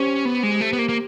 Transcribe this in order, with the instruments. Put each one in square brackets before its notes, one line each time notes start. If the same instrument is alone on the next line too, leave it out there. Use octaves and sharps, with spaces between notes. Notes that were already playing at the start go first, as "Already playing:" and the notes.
Already playing: [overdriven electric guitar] C#4 [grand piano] G4 C5
[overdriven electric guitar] B3
G#3
A3
B3
A#3
A#3